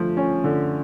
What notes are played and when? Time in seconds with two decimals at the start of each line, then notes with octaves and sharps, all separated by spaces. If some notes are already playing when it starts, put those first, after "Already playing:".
Already playing: D3 F3 A3
0.17 C#4
0.44 D3